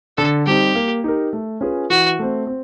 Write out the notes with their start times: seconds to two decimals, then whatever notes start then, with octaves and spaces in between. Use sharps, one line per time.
0.17 D3 A4
0.46 G3 C4 D#4 G4
0.75 A#3
1.04 D#4 G4 A#4
1.33 A3
1.61 C#4 F4 G#4 B4
1.90 E3 F#4
2.19 A3 C4
2.47 C4